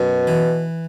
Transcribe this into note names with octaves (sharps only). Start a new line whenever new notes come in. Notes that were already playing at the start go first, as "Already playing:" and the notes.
Already playing: F#2 B2
E3